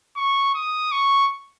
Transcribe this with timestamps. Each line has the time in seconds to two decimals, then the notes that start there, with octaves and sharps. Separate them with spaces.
0.16 C#6
0.55 D#6
0.92 C#6